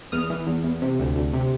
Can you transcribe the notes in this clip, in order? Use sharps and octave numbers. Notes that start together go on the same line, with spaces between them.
E2 D#6 F6
E3
E2
E2
C3
D2
D2
C3